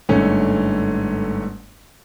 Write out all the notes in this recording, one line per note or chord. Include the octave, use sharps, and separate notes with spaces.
G1 G#2 D3 A3 C#4